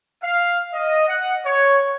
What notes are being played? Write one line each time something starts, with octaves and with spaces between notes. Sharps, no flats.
F5
D#5
F#5
C#5